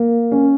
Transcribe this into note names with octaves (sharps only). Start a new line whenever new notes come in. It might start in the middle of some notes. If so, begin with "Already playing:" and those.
Already playing: A#3
C#4